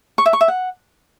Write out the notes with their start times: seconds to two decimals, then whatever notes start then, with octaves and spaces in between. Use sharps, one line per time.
0.18 C#6
0.26 E5
0.33 C#6
0.41 E5
0.48 F#5